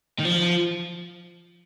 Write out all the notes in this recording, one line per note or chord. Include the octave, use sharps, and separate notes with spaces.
D#3
F3